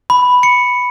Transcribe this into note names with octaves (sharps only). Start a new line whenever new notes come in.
B5
C#7